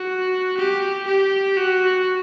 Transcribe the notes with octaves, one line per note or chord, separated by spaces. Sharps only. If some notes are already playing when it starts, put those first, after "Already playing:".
Already playing: F#4
G4
G4
F#4